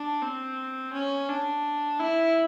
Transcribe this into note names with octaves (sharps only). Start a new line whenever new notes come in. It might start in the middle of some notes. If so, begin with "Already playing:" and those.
Already playing: D4
C4
C#4
D4
E4